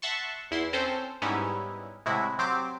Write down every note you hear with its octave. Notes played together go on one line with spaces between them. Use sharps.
E5 F#5 A5 C6 C#6
E2 E4 C6
C4 C#4 A4 C5
G#2 G3 B3 C#4 D#4 E4
A2 C3 G#3 E4 F#4
F#3 C4 G4 C5 D6